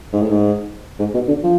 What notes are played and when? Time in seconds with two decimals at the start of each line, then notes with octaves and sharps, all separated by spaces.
0.13 G#2
0.22 A2
0.31 G#2
0.99 G#2
1.14 B2
1.28 D3
1.43 F3